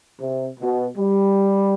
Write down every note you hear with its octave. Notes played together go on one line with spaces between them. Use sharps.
C3
B2
G3